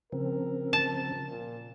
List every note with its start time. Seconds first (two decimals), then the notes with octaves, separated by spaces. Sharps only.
0.12 C#3 F3 C4 A#4
0.73 A5
1.28 A#2